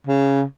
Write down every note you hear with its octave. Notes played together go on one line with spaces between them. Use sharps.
C#3